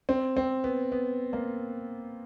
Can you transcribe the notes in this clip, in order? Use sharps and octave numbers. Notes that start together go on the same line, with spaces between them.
C4
C4
B3
B3
A#3